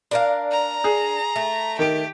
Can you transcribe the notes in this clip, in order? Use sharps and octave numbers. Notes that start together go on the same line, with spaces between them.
D4 A#4 F5
A#5
G#4
A3
D#3 G4 D7